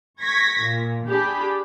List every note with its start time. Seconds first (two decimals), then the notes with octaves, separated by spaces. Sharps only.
0.20 C#6 G#6 A#6 B6
0.64 A#2
1.08 D4 G4 G#4 B5